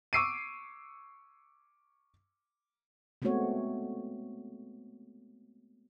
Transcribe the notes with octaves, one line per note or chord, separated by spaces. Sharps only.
C#6 D6 E6 C7 D7 D#7
G#3 A3 B3 C4 F#4 C#5